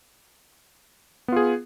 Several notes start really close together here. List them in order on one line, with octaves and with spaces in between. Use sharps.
B3 F4 G#4